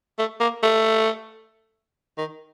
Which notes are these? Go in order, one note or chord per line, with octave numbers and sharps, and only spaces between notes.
A3
A#3
A3
D#3